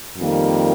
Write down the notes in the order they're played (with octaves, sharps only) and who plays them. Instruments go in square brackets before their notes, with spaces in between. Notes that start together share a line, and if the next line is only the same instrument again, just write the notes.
[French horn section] F2 D#3 G3 A#3